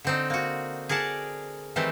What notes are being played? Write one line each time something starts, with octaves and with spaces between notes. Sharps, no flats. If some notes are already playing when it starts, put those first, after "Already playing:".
D3 C4 D#4
A#3 F#4
G#4 A#4 D5 F#5 A5
D#3 E3 G3 A3 C4